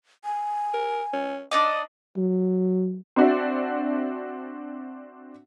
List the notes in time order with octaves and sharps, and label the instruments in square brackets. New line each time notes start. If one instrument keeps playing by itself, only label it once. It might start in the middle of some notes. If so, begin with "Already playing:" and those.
[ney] G#5
[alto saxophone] A#4
C#4
[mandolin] D4 D#4 D6 [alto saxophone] D#5
[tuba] F#3
[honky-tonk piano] C4 D4 F#4 D5 E5